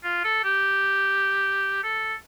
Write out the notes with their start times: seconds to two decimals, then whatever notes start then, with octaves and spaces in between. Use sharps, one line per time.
0.04 F4
0.24 A4
0.44 G4
1.83 A4